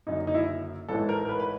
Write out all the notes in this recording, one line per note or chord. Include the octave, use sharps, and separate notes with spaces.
F#1 F#2 D3 D#4
D#4
E4
A1 G#2 E3 G#3 A4
A#4
A#4
B4
B4